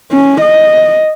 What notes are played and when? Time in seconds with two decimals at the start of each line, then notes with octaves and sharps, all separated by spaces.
0.11 C#4
0.41 D#5